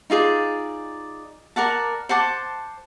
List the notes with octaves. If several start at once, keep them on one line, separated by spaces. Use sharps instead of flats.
D#4 F4 G#4 D5
A#4 D5 F#5 A5
C5 F#5 A5 D6